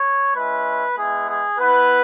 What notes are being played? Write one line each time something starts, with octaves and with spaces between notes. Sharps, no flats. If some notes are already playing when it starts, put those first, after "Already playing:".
Already playing: C#5
G#3 C#4 E4 B4
G#3 B3 E4 G#4
G#4
B3 E4 B4